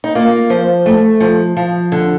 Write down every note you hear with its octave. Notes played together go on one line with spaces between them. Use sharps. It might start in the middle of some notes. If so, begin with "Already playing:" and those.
D#4
A#3 F4
F3 C5
A3
F3
F3
D3